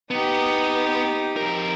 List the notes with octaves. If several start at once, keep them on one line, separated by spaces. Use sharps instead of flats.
B3 D#4 G4
F2 A#4